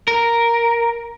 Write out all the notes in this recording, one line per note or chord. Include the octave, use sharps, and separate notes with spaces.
A#4